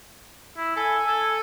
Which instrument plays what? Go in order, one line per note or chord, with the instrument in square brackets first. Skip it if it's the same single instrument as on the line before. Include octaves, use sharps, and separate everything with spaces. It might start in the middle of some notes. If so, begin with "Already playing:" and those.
[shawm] E4
[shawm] A4 [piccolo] G#5
[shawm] A4